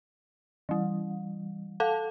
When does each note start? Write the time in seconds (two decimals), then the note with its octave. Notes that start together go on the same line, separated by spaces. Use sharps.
0.69 E3 G3
1.80 A4 F5 A5